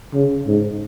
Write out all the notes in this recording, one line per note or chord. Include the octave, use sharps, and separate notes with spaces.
C#3
G#2